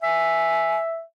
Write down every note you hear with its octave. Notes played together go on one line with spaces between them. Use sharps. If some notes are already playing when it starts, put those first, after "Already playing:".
E5 G#5